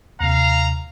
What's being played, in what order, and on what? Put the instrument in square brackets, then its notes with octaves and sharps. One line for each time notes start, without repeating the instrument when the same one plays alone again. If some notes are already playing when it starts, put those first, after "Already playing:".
[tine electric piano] D#2 C3 [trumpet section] F5 A#5